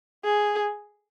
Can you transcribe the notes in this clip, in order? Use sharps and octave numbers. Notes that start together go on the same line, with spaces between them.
G#4